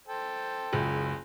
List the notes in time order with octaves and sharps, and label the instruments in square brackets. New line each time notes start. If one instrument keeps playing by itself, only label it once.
[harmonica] A4 C5 G5
[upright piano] F#1 C#2